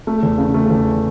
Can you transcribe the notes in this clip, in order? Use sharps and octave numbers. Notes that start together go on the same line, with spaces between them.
A3
E2
C#3
A3
E2